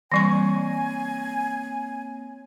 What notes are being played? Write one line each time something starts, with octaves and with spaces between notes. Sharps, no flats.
E3 G3 A#3 C4 C#5 G#5 C#6 A#6